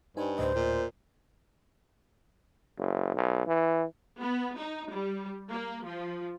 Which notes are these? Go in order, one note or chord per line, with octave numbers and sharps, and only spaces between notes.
G2 D#4 C5 G#5
D2 A2 C5 D#5
A#2
F#1
B1
E3
B3
D#4
G3
A#3
F3